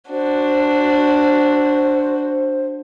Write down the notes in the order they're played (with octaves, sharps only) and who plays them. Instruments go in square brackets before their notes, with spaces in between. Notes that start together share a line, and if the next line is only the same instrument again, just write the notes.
[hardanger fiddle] D4 F#4 [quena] C5